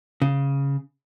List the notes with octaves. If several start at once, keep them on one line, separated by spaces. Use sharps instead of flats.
C#3